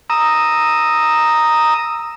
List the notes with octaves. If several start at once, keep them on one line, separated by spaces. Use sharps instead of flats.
A#5 D#6 E6